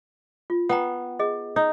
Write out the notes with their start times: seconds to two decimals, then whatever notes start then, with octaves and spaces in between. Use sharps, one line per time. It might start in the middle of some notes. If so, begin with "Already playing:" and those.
0.50 F4
0.69 B3 B4 F#5 G5 A#5
1.19 G#4 D#5
1.56 D#4